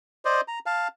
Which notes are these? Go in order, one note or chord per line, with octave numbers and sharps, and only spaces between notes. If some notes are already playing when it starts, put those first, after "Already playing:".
C5 D5 D#5
A#5
F5 A5